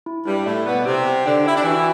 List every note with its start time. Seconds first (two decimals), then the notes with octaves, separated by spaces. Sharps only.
0.06 E4
0.26 G2 G3 E4
0.46 A2 A3 D5
0.66 B2 B3 D5
0.85 C3 C4 G4
1.06 G4
1.26 D3 D4 G5
1.46 E4 G5
1.55 D4
1.64 E3 E4 F#4